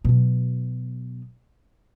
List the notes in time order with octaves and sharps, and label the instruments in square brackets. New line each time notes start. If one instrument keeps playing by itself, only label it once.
[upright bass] B2 F#3